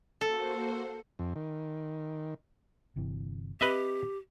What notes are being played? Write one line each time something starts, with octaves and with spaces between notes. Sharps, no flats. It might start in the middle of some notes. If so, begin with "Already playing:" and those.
A#3 F#4 A4 C5
F2
D#3
G1 C3 E3
C4 G4 B4 D#5 E5